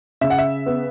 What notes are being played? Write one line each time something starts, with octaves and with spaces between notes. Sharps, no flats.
C#3 E5
F#5
E5
B3